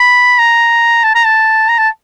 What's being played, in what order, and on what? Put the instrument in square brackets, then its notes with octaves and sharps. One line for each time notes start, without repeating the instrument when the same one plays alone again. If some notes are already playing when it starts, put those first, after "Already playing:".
Already playing: [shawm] B5
A#5
A5
A#5
A5
A#5
A5